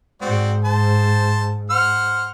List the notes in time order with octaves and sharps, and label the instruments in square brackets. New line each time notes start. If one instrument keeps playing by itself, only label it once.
[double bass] G#2 [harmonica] C4 F#4 D5
[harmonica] C5 A5
C5 F#5 F6